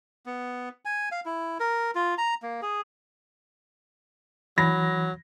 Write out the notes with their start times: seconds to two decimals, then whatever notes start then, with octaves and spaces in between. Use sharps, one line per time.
0.26 B3
0.85 G#5
1.12 F5
1.26 E4
1.60 A#4
1.95 F4
2.18 A#5
2.42 A#3
2.62 G#4
4.58 E3 F#3 B5 A#6